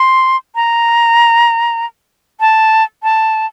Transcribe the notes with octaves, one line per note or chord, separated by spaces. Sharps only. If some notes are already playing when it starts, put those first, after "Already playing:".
Already playing: C6
A#5
A5
A5